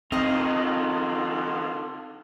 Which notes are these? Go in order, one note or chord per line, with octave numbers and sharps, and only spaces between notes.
D3 C4 D#4 F4 D#5 C6